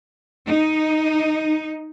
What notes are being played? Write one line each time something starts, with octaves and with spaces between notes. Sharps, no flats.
D#4